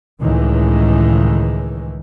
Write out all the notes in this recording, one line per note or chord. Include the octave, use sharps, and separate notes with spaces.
C#2 A2 D#3 E3 G#3